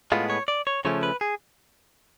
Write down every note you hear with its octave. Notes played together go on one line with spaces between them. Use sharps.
A2 G#3 B3 F4
C#5
D5
C#5
C#3 F3 A3 C#4 C#5
B4
G#4